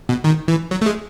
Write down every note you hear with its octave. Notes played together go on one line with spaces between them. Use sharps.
B2
D#3
E3
F#3
A3
G#3